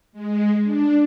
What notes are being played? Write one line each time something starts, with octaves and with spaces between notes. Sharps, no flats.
G#3
D4